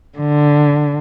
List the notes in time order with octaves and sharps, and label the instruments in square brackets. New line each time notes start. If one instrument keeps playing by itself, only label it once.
[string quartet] D3